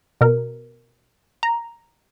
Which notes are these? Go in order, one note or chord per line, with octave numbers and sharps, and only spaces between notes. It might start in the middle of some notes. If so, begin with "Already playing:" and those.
B2 A#4
A#5